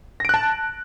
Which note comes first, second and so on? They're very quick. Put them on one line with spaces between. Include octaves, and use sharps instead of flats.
A#6 D7 F#6 A5